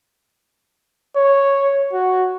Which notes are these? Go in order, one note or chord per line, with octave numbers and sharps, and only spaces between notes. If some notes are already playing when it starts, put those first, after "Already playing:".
C#5
F#4